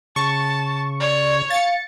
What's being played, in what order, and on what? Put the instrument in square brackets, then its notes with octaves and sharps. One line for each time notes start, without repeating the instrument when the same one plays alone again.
[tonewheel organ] C#3 [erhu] A5 [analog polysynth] C#6
[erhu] C#5 [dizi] D5
[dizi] F5 [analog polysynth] A6 C#7